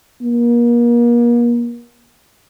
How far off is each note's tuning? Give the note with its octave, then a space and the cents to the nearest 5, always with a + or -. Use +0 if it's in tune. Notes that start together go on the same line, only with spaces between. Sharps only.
A#3 +35